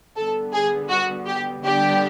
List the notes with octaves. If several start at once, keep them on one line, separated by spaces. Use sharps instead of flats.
D3 G3 B3 A4
G#4
F#4
G4
D3 G3 B3 D4 G4